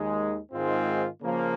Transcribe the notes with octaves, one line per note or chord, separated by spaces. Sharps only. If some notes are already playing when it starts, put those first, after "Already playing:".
Already playing: D#2 D#3 G#3 D#4
G#2 D#3 G#3 C4 F4
C#3 F3 A#3